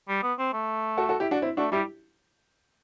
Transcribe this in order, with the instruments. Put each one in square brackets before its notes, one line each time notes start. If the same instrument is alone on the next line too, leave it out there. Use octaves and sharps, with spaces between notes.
[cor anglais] G3
B3
C4
A3
[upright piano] F#4 A4
F#4 A4
E4 G4
D4 F#4
C4 E4
[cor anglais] A3 [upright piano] D4 F#4
[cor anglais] G3 [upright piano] E4 G4